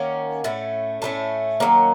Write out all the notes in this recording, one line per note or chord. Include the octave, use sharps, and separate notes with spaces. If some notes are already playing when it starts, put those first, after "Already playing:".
Already playing: D#3 A#3 C#4 F#5
A2 A3 C#4
A2 A3 C#4 A5
D#3 F#3 A#3 C#4